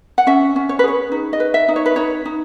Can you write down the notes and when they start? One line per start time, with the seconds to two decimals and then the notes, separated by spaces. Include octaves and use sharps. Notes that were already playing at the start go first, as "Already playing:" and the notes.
0.18 F#5
0.27 C#4 E5
0.56 C#4
0.69 C#5
0.79 B4
0.84 G#4 C#5
1.12 D#4
1.33 D#5
1.40 B4
1.54 E5
1.69 D#4
1.76 C#5
1.86 B4
1.96 D#4 C#5
2.25 D#4